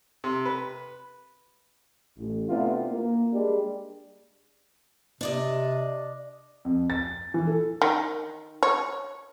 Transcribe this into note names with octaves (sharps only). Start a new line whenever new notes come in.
C3
B4
A1
C3 A3 B3 D4 E4 F4
A#3
G3 G#3 D4
C3 D4 D5 D#5
F2
A6
E3
A4
D#3
C#5